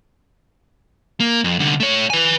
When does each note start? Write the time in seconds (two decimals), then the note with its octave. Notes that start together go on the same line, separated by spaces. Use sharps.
1.20 A#3
1.44 F2
1.59 C2 D3
1.80 A3 C#5
2.10 B4 G#5